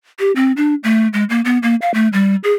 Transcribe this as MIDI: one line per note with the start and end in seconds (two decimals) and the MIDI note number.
0.19 0.32 67
0.36 0.52 60
0.57 0.75 62
0.84 1.08 57
1.13 1.24 56
1.30 1.41 58
1.45 1.58 59
1.63 1.75 58
1.82 1.92 77
1.94 2.08 57
2.13 2.36 55
2.44 2.52 68